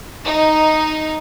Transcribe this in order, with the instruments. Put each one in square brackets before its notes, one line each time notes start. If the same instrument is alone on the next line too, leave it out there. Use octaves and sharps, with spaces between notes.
[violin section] D#4